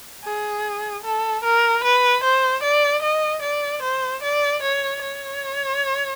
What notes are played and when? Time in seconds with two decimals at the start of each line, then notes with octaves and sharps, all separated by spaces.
0.24 G#4
1.04 A4
1.43 A#4
1.84 B4
2.24 C5
2.63 D5
3.02 D#5
3.42 D5
3.82 C5
4.22 D5
4.63 C#5
5.02 C#5